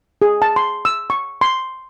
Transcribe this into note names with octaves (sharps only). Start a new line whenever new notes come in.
G#4
A5
C6
E6
C#6
C6